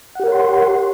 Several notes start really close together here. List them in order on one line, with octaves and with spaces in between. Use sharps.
F#5 G4 A#4 C#5 C6